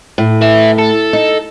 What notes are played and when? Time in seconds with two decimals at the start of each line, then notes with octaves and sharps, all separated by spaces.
0.18 A2
0.41 B4 E5
0.78 A4
1.13 D#4